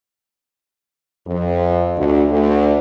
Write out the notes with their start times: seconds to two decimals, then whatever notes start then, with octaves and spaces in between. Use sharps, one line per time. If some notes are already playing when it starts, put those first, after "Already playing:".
1.27 F2
1.97 D2
2.30 D2